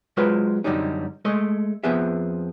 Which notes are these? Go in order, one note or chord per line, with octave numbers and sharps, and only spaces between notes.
F#3 G#3 F4 B4 C5
F#2 B2 D3 F#3 G3 D#4
G#3 A3 D#5
F2 F3 B3 G#4 E5